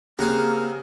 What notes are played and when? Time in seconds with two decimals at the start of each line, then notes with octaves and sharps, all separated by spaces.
0.19 C#3 A#3 C4 G4 G#4 F#5 A#5